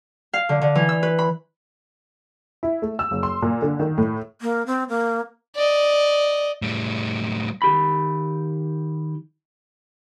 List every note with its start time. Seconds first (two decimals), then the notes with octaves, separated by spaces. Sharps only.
0.33 F5
0.49 D3
0.61 D3
0.75 E3
0.89 E6
1.03 B4
1.19 B5
2.63 E4
2.82 A3
2.99 E6
3.11 F#1
3.23 C6
3.42 A#2
3.62 D3
3.80 D#3
3.98 A2
4.41 A#3
4.67 C4
4.89 A#3
5.56 D5 D#5
6.62 A2 G3
7.62 D#3 G4 B5